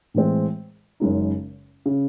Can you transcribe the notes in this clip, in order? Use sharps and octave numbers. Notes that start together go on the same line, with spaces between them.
A2 E3 G#3 C4
F#1 F#2 C#3 G#3 D#4
C#3